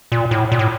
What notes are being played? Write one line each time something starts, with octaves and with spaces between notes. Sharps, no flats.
A#2
A2
A#2
A2